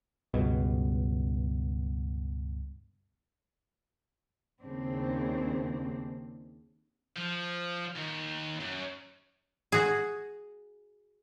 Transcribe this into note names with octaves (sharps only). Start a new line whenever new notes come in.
C#2 G2 B2
D#2 C#3 C4 D4
F3
D#2
F#2
F#4 G#4